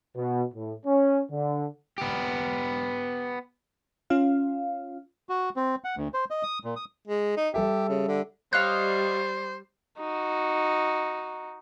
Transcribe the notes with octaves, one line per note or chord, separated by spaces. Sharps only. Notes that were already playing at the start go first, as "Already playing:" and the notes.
B2
A2
C#4
D3
B3 G4
C#4 F4 F5
F#4
C4
F#5
D2
C5
D#5
D#6
A#2
D#6
G#3
D#4
G3 G4 A4 E5
C#3
D3
G3 C5 C#5 D#5 F5 F#6
D#4 F#4